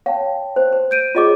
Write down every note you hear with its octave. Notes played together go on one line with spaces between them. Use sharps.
C#5 F5 G5 A5
C5
C5
G6 D7 D#7
F4 G#4 C#5 D#5 D6